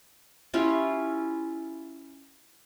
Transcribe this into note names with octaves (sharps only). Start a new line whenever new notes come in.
C#4 E4 F4 G4